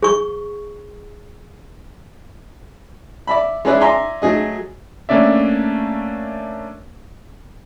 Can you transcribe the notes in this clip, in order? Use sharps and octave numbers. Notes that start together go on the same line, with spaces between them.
G#4 C#6
D5 E5 B5
G#3 C#4 G#4 B4 D5 E5
D5 E5 G#5 A#5 C6
F#3 A3 G#4 D#5
A3 A#3 C#4 D4 D5 E5